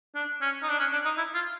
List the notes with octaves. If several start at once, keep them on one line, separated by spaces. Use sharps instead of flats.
D4
C#4
D#4
D4
C#4
D4
D#4
E4
F4